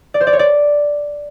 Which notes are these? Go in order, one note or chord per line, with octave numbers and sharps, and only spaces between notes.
D5
C5
D5
C#5
D5